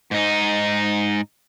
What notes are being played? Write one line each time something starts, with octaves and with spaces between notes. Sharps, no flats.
G#2 D#4